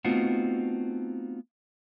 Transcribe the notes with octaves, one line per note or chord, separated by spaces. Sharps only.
A3 B3 C4 D#4 F4 F#4